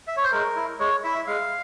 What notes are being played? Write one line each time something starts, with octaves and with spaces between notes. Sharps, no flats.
E5
C#5
C5
G#3 A#4
E4
G#3 C#5
E4 E5
G#3 F5